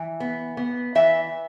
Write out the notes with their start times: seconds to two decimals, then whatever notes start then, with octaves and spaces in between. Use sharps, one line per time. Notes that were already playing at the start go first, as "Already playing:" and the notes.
Already playing: E3
0.20 B3
0.57 B3
0.95 E3 E5